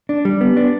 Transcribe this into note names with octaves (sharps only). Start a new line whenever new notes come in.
D4
G3
B3
D4